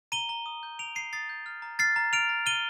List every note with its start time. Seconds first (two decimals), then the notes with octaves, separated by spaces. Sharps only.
0.12 A#5 D#7 G7
0.29 A#5
0.46 D#6
0.63 G6
0.79 A#5 D7 F7
0.95 A#5 C7 D#7
1.13 D#6 A6 C7
1.29 G6
1.46 F6
1.62 A#5
1.79 F6 A6 C7
1.96 A#5
2.13 F6 D7 F7
2.29 A#5
2.46 F6 D#7 G7